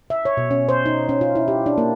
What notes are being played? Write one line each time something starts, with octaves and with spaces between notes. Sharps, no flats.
E5
C#5
B2
C#4
C5
D#4
C#4
F4
E4
G4
D4
A#3